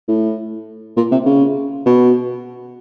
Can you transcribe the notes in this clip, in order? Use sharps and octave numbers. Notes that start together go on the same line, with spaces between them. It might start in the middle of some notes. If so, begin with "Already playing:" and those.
A2
A#2
C3
C#3
B2